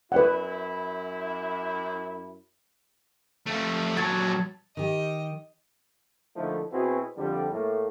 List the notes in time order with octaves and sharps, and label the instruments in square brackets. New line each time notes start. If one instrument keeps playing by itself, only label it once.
[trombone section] F#2 E4 [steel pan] B4 D5 F#5
[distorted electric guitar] F3 A3
[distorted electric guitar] A#2 F#3 [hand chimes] A5 G#6 A6
[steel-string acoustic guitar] D#3 G4 [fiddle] D#5
[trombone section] D3 F3 A3 A#3 D#4 E4
B2 B3 C4 E4 F#4 G#4
F2 D3 F3 G3
A2 A3 A#3